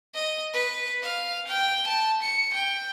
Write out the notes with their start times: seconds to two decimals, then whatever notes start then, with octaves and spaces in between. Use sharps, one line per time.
0.14 D#5
0.53 B4
1.02 F5
1.47 G5
1.87 A5
2.22 C#7
2.54 G5